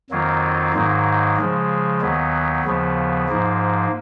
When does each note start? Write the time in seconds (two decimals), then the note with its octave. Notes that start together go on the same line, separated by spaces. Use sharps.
0.10 F2 D#3 F#3 A#3 F4
0.74 G#2 D#3 F#3 A#3
1.37 C#3 F3 G#3
2.01 D#2 D#3 F#3 B3
2.65 D#2 C#3 F3 B3
3.28 G#2 F3 A#3